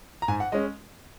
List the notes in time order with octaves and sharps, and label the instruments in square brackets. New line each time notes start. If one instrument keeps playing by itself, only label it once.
[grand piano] A#5
G#2 G#5
F#5
G#3 C#4 D#5